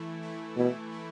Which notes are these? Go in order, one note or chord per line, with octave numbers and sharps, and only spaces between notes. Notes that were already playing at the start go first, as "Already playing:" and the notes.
Already playing: E3 A3 E4
E3 A3 E4
B2 E3 A3 E4
E3 A3 E4